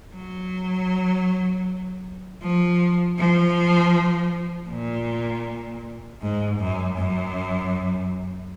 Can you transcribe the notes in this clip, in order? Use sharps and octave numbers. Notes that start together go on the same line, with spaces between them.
F#3
F3
F3
A#2
G#2
F#2
F#2